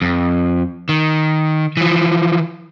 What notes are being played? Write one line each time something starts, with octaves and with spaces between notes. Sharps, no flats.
F2
D#3
E3 F3